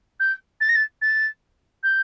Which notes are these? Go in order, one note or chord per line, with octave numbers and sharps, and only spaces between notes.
G6
A6
A#6
A6
A6
G6